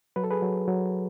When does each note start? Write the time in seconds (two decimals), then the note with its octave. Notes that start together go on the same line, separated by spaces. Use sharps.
0.16 F#3 B4
0.24 A4
0.31 G#4 B4
0.43 F#3
0.68 F#3